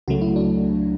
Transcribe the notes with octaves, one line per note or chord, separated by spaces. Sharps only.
C#2 C#3 F#3 A3 F#4
E4
D4